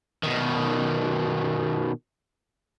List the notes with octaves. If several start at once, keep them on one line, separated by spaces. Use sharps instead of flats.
B2 D#3